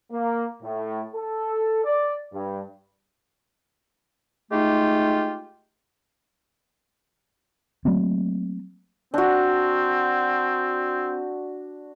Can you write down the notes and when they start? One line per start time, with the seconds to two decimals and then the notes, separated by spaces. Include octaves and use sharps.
0.12 A#3
0.63 A2
1.14 A4
1.85 D5
2.33 G2
4.51 G#3 A3 D#4 F4 G4
7.85 F#3 A3 A#3 C4
9.14 C4 D4 F#4